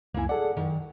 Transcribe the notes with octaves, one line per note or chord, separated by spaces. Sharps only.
C#2 F#2 A#3 E4 G#5
G#4 A4 D5 F#5
F#2 D#3